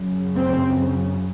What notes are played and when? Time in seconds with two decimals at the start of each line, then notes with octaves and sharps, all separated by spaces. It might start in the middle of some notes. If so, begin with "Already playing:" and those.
Already playing: F#2 C#3
0.36 C4